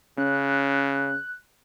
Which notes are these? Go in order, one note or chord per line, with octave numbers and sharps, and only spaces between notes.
C#3 C#4 F#6